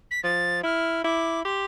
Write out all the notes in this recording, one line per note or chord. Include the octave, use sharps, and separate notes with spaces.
B6
F3 A6
E4 F6
E4 D6
G4 C6